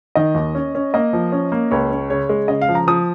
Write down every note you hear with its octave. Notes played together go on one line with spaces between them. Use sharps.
D#3 D#5
D#2
C#4
C#4
A#3 D#5
F3
C#4
A#3
C#2 C#5
C#4
C#3 C#5
G#3
C#3 D#5
F5
F3
A#5
F3 D#6